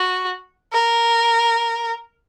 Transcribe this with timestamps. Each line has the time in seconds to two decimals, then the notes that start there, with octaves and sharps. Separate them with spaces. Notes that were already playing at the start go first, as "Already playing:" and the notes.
Already playing: F#4
0.73 A#4